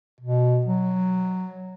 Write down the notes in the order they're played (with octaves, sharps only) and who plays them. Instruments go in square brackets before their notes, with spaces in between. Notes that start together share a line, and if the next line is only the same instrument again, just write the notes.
[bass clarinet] B2
F#3